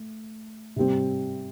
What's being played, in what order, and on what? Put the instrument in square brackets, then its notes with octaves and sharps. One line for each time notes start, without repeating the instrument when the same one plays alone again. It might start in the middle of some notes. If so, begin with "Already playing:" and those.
Already playing: [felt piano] A3
C3 G3 C4 G4